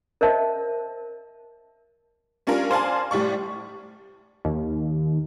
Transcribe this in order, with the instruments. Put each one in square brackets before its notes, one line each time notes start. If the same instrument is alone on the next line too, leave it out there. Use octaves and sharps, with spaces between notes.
[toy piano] A#4 C5 C#5 D#5 E5 A5
[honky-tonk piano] G3 C#4 D4 F4 A#4
C5 D5 F5 G#5 A5
A2 G3 D5 C#6
[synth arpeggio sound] D#2